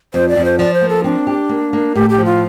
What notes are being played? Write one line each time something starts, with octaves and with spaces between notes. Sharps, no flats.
F2 C5
D5
F2
C5
F3 D5
C5
A#3
A4
C4 D4
G4
A#3
A#3
A2 G4
G4
F3
F4